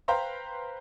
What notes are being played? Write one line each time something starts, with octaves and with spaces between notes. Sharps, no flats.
B4 C5 F5 G5 A#5 C6